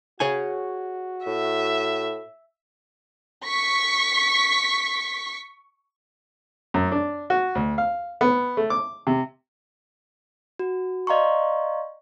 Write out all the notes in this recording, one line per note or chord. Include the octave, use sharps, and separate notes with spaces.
F#4 G#4 C#5 G#5
A2 E5
C#6 B6
F#2
D4
F#4
D2
F5
B3
A3
D6
C3
F#4
D5 D#5 F5 A#5 C6 C#6